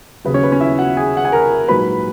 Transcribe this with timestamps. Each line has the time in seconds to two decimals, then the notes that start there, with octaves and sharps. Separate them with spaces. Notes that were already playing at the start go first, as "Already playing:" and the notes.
0.25 D#2 C#3 F#3 B4
0.34 C#4 C#5
0.43 B4
0.52 C#4 C#5
0.60 E4 E5
0.79 F#4 F#5
0.97 G#4 G#5
1.17 F#5
1.25 G#5
1.32 A#4 A#5
1.68 A#1 G#2 F#3 B4 B5